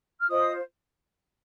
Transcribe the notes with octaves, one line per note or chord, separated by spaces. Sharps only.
F6
F4 C5 D#5 D#6